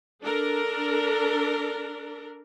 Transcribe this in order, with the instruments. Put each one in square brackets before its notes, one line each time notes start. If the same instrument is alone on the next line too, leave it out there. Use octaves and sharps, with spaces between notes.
[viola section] D4 A4 A#4